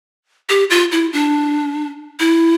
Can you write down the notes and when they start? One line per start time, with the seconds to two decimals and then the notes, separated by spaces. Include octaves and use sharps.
0.49 G4
0.70 F4
0.92 E4
1.13 D4
2.19 E4